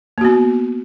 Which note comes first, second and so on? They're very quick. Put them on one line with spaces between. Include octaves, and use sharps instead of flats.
A#3 F#4 B3